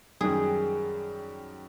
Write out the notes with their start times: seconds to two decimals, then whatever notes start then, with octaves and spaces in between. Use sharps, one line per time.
0.21 F#2 D#3 G3 G#4